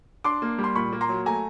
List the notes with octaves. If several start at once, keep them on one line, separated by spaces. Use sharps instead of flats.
D4 C6 D6
A#3
G3
C6
A#2 B5 C#6
A#3
A#5 C6
F#3
A3 G#5 A#5